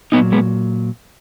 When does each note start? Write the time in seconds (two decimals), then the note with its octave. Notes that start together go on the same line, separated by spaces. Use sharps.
0.12 A#2 F#3 B3 D#4
0.32 G#3 B3